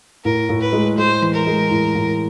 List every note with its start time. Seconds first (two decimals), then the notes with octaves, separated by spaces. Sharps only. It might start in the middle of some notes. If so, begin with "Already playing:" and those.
0.24 A2 A#4
0.49 A2
0.61 B4
0.73 G#3
0.97 G#3 C5
1.22 E3
1.34 A#4
1.47 G#3
1.71 A2
1.95 A2